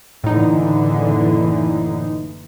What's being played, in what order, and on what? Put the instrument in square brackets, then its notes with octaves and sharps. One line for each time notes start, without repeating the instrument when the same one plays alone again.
[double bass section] F#1 D3 E3 [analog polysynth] A2 D#4